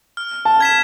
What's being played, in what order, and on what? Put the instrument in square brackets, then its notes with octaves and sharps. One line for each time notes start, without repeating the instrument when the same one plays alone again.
[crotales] F6
[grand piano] A5
[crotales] G#6 B6 E7